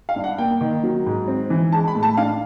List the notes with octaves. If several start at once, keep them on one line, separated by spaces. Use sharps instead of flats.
F5
G2
F#5
A#3 G5
D#3
F#3
G#2
C4
E3
G#3 A5
B5
A2
A5
D4 F5